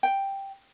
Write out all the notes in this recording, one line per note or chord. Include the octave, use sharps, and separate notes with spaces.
G5